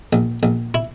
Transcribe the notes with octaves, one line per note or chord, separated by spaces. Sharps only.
A#1
A#1
E4